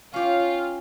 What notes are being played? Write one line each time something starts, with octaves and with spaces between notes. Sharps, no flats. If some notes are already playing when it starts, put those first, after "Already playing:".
C#4 F4 G4 F5